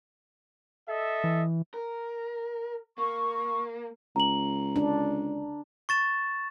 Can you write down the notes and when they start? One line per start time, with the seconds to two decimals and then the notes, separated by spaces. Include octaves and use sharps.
0.89 A4 D#5 E5
1.24 E3
1.74 A#4
2.98 A#3 C#6
4.16 C#2 A#5 F#7
4.76 D4
5.89 C#6 A6 E7